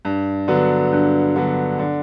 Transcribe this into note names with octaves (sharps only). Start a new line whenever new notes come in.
G2
D3 F#3 B3
G2
D3 F#3 B3
D3